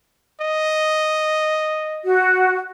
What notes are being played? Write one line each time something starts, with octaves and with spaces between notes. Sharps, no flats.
D#5
F#4